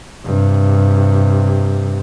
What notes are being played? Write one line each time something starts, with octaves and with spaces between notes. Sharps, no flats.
G2 C3